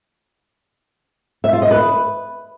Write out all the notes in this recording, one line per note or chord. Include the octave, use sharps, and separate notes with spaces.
E5
F4
D#5
B4